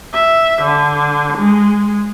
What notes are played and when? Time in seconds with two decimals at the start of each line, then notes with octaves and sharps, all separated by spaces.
0.13 E5
0.62 D3
1.37 G#3